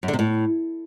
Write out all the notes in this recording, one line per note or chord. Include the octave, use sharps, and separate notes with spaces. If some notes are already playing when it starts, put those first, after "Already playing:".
F#2
D3
C3
A2